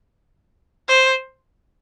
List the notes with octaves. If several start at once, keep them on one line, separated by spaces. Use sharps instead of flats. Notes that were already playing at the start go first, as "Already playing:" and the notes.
C5